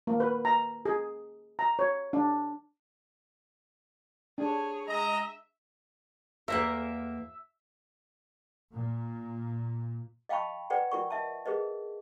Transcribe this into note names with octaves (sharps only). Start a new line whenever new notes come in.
A#3
B4
A#5
G#4
A#5
C#5
D4
D4 G#4 C#5
G#3 D#5 E5 A#5
E2 A#3 A#4 E5
A#2
D#5 F5 G5 A5 B5 C#6
B4 D5 F#5 G5
F4 A#4 C#6
D#5 E5 A5
G#4 A#4 B4 D#5